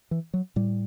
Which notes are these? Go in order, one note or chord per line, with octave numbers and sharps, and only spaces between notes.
E3
F#3
A2 G3